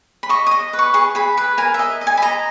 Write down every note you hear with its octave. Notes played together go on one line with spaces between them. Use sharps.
B5
D#5 C#6
D#5 D#6
B4
C#6
G#4 C#6
G#4 B5
B4 B5
A#4 G#5
D#5 E5
D#5
G#5
B5
D#5 A#5